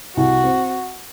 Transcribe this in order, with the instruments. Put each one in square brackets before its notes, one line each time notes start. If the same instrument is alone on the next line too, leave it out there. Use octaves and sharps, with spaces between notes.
[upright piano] C2 [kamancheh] F#4
[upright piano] C4